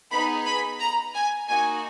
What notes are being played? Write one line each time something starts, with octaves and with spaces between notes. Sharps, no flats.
B3 D#4 G#4 B5
B5
A#5
G#5
A#3 D#4 F#4 G#5